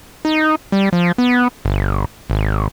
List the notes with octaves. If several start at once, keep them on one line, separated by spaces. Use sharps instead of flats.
D#4
G3
F3
B3
G1
G#1